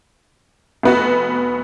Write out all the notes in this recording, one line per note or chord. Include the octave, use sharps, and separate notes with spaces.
F1 B3 F#4